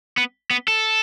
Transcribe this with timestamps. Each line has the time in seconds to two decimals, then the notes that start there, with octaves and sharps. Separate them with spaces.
0.17 B3
0.51 B3
0.68 A4